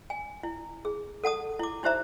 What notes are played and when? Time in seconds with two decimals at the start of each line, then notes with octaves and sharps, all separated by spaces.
0.10 G#5
0.43 E4
0.85 G#4
1.24 A4 F#5 A5 D#6
1.59 E4 D6
1.83 D#4 E4 G4 C5 E5 A#5